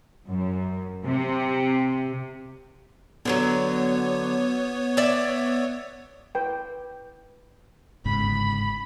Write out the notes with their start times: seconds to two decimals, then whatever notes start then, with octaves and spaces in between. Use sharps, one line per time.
0.29 F#2
1.07 C3
3.25 D3 E3 F#3 B3 C#5
4.97 D5 E5
6.35 B4 G5
8.05 G1 G#2 C#3 B5